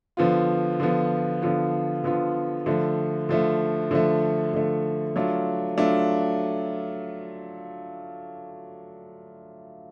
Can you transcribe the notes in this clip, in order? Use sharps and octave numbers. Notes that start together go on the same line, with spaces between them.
D3 F3 B3 F4
D3 F3 B3 F4
D3 F3 B3 F4
D3 F3 B3 F4
D3 F3 A3
D3 F3 A3
D3 F3 A3
D3 F3 A3
F#3 A3 D4 F4
F#3 A3 D4 F4